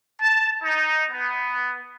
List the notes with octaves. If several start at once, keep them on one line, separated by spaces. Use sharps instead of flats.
A5
D#4
B3